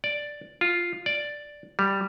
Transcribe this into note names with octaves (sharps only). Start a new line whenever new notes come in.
D5
F4
D5
G3